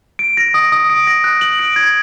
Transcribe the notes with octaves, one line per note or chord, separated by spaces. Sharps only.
D7
A#6
D#6
D#6
D7
A#6
F#6
F#7
D7
G#6